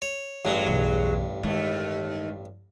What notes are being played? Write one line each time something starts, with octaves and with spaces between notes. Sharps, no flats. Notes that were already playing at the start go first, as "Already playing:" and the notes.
C#5
A1 G2 F#3 G#3
B1 E2
D#2 G#3 A3